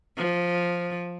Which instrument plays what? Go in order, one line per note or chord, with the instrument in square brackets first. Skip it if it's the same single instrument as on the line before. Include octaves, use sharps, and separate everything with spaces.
[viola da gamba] F3